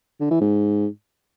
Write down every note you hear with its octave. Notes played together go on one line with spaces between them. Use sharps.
D3
E3
G#2